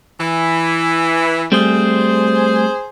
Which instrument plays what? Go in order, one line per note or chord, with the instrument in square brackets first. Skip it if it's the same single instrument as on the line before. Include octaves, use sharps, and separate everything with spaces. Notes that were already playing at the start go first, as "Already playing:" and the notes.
[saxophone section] E3
[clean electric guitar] G3 A3 C4 [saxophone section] G#4 C5